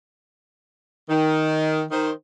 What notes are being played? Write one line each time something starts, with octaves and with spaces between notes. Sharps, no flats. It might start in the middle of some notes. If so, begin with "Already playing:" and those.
D#3
D#3 C5